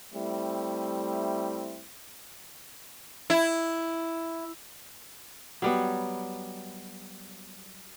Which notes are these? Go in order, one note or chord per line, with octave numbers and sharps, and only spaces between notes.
G3 A3 C4 E4
E4
F#3 G3 B3